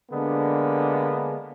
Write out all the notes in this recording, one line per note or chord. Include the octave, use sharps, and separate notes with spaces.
D3 G#3 A#3 B3 D4